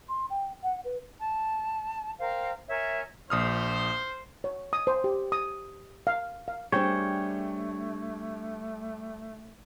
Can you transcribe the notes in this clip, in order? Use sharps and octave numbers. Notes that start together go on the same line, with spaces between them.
C6
G5
F#5
B4
A5
A#4 C5 F5 G5
A#4 C#5 E5 G#5
A#1 C5 D#6 F6
C#5
D#6
C5
G4
D#6
F5
F5
G3 A3 C4 D4 G#4 C#5 G5